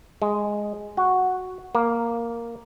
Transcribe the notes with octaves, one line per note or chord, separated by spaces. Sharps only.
G#3
F#4
A#3